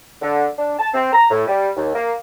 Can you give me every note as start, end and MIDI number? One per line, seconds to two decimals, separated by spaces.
0.22 0.46 50
0.58 0.74 62
0.79 0.89 81
0.94 1.12 60
1.13 1.29 82
1.31 1.43 45
1.47 1.70 55
1.77 1.93 39
1.95 2.12 58